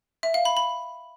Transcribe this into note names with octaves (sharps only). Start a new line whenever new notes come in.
E5
F5
B5
B5